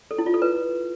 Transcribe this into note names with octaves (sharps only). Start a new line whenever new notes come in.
A4
E4
F4
A4
B4